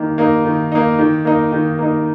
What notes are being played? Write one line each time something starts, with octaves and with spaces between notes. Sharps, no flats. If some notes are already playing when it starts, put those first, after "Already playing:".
Already playing: D#3 A#3
A#3 D#4
D#3
A#3 D#4
D#3
A#3 D#4
D#3
A#3 D#4